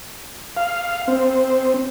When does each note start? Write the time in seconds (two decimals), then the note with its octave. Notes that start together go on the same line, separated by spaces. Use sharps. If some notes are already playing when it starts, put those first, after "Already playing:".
0.57 F5
1.08 C4